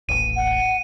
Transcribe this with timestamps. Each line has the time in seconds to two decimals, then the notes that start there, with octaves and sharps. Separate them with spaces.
0.09 D#1 A1 D#7
0.36 F#5